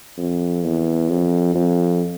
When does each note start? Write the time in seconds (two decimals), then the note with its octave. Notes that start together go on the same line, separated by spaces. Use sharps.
0.18 F2
0.63 E2
1.09 F2
1.55 F2